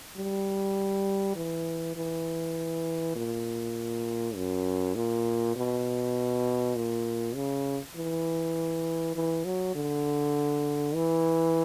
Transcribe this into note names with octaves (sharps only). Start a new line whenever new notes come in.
G3
E3
E3
A#2
F#2
A#2
B2
A#2
C#3
E3
E3
F#3
D3
E3